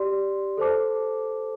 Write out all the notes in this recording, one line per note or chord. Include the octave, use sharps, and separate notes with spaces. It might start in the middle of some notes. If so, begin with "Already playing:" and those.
Already playing: G4 D5 C6
A4 C5 A5 D6